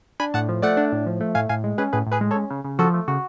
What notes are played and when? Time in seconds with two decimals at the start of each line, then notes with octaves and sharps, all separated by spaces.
0.20 D4 G#5 B5
0.34 A2 F#5 A5
0.49 F3
0.62 A3 D5 F#5
0.77 D4
0.92 A2
1.06 F3
1.20 A3
1.35 A2 F5 G#5
1.49 A2 F5 G#5
1.64 G#3
1.78 C#4 G#4 B4
1.93 A2 G#4 B4
2.07 A2
2.12 G#4 B4
2.21 G#3
2.31 A4 C#5
2.36 C#4
2.50 C#3
2.64 C#3
2.79 F3 F#4 A4
2.94 A3
3.08 C#3 F#4